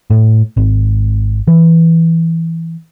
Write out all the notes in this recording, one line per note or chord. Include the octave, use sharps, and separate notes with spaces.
A2
G#1
E3